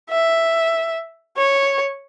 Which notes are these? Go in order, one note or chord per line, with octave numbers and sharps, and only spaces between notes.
E5
C#5